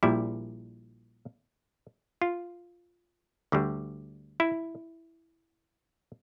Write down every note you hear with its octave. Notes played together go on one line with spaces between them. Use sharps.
A#1 A#2 G3 E4
F4
D2 D3 G3
E4